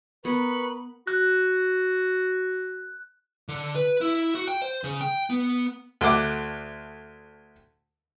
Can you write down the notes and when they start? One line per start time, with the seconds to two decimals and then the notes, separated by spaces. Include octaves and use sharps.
0.25 B3 A#4 B4 B5 C#6
1.07 F#4 F#6
3.48 D3
3.75 B4
4.01 E4
4.35 F#4
4.48 G5
4.62 C5
4.84 C#3
5.01 G5
5.30 B3
6.01 D2 A3 F#5 D6